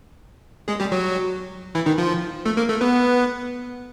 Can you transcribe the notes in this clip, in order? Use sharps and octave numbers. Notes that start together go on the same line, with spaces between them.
G#3 G#4
G3 G4
F#3 F#4
E3 E4
D#3 D#4
F3 F4
A3 A4
A#3 A#4
A3 A4
B3 B4